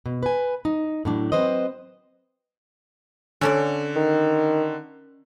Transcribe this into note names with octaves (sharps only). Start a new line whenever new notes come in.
B2
B4 G#5
D#4
A2 F#3 D4
F#3 C4 B4 C5 D#5
D3 C#4 A4 D5
D#3